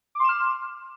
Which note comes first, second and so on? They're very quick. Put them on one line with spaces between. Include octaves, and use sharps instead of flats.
D6 C6 E7 F6